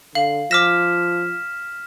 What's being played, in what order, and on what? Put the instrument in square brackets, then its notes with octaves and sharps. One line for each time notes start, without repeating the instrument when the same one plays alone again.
[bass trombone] D3 [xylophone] F5 F#7
[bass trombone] F3 [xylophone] D6 A#6 [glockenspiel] F6 B6 E7